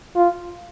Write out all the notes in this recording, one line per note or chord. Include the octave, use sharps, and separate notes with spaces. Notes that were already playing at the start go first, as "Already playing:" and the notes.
F4